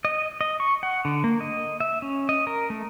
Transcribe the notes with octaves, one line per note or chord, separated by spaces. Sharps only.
D#5
D#5
C#6
F#5
D3
A#3
D#5
E5
C#4
D#5
A#4
A3